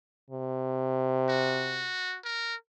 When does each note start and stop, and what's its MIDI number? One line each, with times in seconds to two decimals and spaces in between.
0.30 1.91 48
1.29 2.18 66
2.24 2.55 70